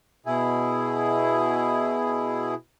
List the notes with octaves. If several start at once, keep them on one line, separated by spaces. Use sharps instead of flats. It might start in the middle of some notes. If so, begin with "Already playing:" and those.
B2 E4 G#4